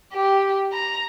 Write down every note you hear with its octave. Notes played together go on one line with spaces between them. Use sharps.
G4
A#5